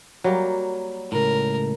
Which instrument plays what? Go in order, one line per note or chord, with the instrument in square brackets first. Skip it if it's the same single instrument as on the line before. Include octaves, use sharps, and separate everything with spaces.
[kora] F#3 G3 A#3
[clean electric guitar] C#2 A2 [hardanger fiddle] A#4